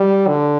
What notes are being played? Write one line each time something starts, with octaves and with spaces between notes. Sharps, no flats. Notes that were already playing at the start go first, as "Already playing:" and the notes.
Already playing: G3
D3